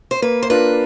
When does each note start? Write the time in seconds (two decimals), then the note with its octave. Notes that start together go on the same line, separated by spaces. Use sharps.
0.11 C5
0.22 A#3 B4
0.42 C5
0.50 D4 F4 A#4 B4